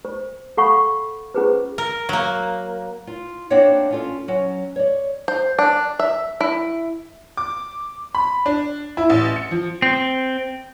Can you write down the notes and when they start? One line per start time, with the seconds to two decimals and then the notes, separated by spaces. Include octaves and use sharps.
0.05 C5
0.57 A4 F5 F#5 B5 C#6
1.35 C#4 F4 G#4 B4 C5
1.78 A#4
2.09 F#3 A#3
3.07 F4
3.50 A#3 C4 D4 D#4 C#5 F#5
3.91 C#4 F4 A4
4.28 F#3 C#4
4.76 C#5 D5
5.28 C5
5.59 D4
5.99 E5
6.41 E4
7.37 D6
8.15 B5
8.46 D4
8.97 E4
9.10 A1
9.36 C#7
9.51 F3
9.82 C4